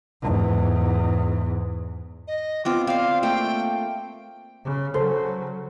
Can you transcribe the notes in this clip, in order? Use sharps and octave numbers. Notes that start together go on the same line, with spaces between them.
E2 G#2
D#5
B3 C4 F4 D6
C4 D5 F5
A3 A#3 G5
C#3
C#3 F#3 A4 C5